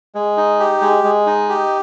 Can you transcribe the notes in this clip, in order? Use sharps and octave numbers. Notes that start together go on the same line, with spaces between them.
G#3
D#4
G4
G#3
G#3
D#4
G4